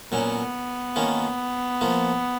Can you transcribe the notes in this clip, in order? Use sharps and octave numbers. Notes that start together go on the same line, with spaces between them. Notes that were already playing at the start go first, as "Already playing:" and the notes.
A#2 F#3 B3 C#4
D#3 A#3 C#4 F4
F3 A#3 F4